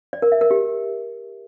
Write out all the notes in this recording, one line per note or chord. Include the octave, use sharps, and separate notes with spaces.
D5
A#4
E5
A#4
G4